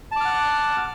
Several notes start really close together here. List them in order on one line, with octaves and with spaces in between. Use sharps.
A5 D6 F6 F#5